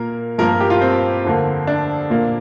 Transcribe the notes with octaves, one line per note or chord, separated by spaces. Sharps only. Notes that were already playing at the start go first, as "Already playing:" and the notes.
Already playing: A#2 A#3 A#4
G2 F3 A#3 A#4
G4
F4
C4
F2 D3 A#3
D4
A#2 A#3